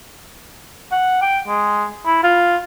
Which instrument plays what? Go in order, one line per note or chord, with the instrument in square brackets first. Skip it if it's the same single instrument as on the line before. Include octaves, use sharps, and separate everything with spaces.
[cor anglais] F#5
G5
G#3
E4
F4